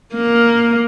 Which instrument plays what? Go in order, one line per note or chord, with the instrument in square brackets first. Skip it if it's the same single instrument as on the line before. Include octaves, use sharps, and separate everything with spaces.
[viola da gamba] A#3